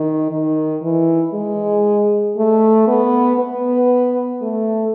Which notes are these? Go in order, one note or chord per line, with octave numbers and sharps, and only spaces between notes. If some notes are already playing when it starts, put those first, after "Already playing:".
Already playing: D#3
D#3
E3
G#3
A3
B3
B3
A3